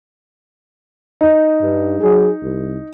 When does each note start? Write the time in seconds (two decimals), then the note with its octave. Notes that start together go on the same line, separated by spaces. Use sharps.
1.21 D#4
1.61 G2
2.00 F#3 G#4
2.41 C2